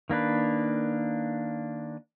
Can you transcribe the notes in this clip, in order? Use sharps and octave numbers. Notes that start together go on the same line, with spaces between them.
D#3 A#3 D4 B4